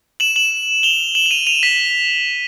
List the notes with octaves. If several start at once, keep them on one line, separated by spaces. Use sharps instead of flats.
E7 F#7
E7 F#7
F7 G7
E7 F#7
F#7
D#7 F7
D#7 F7
B6